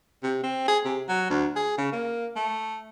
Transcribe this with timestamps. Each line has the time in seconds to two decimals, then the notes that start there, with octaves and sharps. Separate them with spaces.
0.23 C3
0.43 C4
0.68 G#4
0.85 C3
1.08 F#3
1.29 D2
1.56 G#4
1.78 C#3
1.92 A#3
2.36 A3